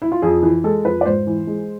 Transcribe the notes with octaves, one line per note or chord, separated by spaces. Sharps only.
E4
F4
F2 G#4
E3
G#3 A4
F2 B4
D5
G#2 C5
E3
G#3